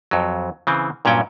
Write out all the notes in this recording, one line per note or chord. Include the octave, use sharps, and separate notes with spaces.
F2 F#3
C#3 E3 C4
G2 A#2 F#3 C#4 G5